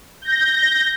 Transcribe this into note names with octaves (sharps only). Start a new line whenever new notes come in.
G6 A#6